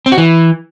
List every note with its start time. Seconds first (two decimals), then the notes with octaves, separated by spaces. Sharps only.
0.06 C4
0.12 F#4
0.18 E3